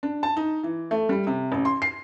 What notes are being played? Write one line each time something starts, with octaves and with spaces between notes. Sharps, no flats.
D4
A5
D#4
E3
A3
G3
C3
A1
C6
C7